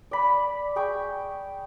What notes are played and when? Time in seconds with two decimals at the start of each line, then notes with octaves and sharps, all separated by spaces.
0.11 D5 B5
0.76 G#4 G5 C#6